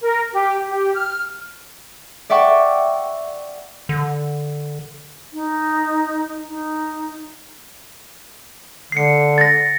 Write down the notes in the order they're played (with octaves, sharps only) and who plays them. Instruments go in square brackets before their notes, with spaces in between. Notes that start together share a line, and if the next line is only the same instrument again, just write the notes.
[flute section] A#4
G4
G4
F6
[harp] D5 E5 F#5 G5 C#6 D6
[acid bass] D3
[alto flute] D#4
D#4
[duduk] D3 [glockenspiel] C7 C#7
[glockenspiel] A6 A#6